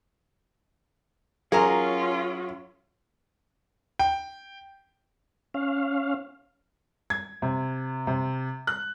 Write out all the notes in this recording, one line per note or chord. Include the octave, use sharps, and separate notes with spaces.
F#3 C#4 F4 G#4 A#4 A#5
G5
C#4 F5
G#6
C3
C3
F#6